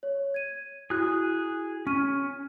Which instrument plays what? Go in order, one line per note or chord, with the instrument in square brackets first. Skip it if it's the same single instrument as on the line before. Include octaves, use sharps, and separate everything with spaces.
[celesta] C#5
G#6 D#7
[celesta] E4 F#4 [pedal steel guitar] G#4 F#6
[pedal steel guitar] C#4 [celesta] C#6 F6 D#7